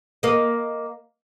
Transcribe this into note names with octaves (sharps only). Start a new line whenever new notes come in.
A#3 D#5